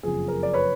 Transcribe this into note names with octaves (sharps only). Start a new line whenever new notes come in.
F#1 F2 C#3 F3 G#4
G#4 A#4
D5
B4 C#5